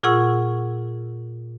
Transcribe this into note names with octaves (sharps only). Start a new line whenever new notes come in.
A#2 F4 G#4 F#5 C#6 E6